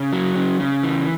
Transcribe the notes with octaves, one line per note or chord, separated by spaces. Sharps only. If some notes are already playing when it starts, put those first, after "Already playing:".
Already playing: C#3
F#3
C#3
C#3
E3